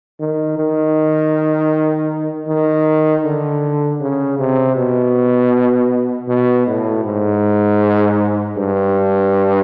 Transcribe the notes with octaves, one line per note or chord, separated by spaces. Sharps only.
D#3
D#3
D#3
D3
C#3
C3
B2
B2
A2
G#2
G2